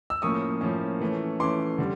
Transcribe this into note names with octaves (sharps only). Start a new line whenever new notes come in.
E6
A2 F3 A#3 C#4 C#6 D#6
A2 F3 A#3 C#4
E3 A3 C#4
E3 A3 C#4 C6 D6
D3 G3